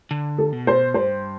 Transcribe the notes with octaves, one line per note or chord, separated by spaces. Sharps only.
D3
A4
B2
C5
G2 C5